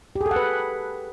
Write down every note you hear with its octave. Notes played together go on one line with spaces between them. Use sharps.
G4
G#4
A4
F#5
B4